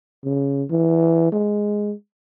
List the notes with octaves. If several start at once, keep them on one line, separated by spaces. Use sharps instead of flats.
C#3
E3
G#3